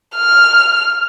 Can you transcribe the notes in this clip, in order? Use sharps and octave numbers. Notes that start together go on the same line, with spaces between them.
F6